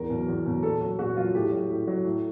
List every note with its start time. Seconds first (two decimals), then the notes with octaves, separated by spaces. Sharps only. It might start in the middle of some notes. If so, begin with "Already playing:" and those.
Already playing: E2 A#4
0.10 B2 F#3
0.28 E2
0.46 B2 F#3
0.63 A#2 A4
0.81 F#3
0.99 A#2 F#4
1.16 F#3 F4
1.34 A2 G4
1.51 F#3
1.70 A2
1.87 F#3
2.05 A2